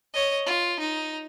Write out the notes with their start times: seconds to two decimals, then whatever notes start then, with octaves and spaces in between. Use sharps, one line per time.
0.14 C#5 D#5
0.46 F4
0.80 D#4